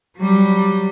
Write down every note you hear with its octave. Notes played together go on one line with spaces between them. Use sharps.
F#3 G3